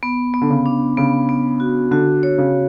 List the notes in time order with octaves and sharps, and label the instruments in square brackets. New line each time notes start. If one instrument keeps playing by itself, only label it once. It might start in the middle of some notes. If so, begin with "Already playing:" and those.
[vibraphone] B3
B3
[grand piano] D3
C#3
[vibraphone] D4
[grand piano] C#3 [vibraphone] B3
[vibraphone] B3
F#4
[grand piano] D3 [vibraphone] F#4
[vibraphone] C#5
[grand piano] C#3